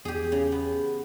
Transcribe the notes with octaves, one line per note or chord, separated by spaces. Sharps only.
E2 G4 G#4
C#3
B3